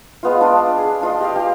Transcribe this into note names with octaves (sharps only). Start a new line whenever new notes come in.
G#3 B3 F4
D4 F4
G#4
D4 F4 D#5
G4 D#5 F5
G4 C6